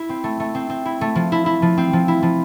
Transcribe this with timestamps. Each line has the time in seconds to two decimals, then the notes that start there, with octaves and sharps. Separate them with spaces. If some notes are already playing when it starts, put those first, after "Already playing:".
Already playing: E4
0.09 C4
0.24 A3
0.40 A3
0.55 C4
0.70 C4
0.85 E4
1.01 A3
1.15 F3
1.32 E4
1.46 E4
1.62 F3
1.77 C4
1.93 F3
2.08 E4
2.23 F3